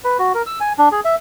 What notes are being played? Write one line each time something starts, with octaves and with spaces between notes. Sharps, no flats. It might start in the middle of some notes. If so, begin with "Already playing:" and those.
B4
F#4
A#4
E6
G#5
D4
G#4
E5